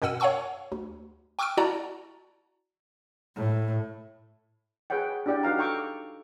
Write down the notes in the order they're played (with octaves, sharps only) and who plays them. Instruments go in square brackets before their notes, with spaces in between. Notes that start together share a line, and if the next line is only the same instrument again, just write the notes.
[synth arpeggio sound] F#2 B2 A#4 F#5 E6 D#7
C#5 F5 F#5 G#5 C#6 E6
D2
G5 C#6 D6 E6 F6 D7
E4 F#4 D5 F#5 A5 A#5
[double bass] A2
[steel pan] G#4 B4 C#5 F#5 G5
D4 E4 G4 D5 F#5 G5
D#4 F#4 B4 F5 A#5
A4 G5 A#5 C#6 D6